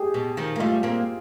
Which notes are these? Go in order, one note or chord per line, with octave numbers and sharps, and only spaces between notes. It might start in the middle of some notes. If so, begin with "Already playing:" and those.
Already playing: G4 G#4
B2
D#3 F3
A#3
G3 A3 F4
A#3 C4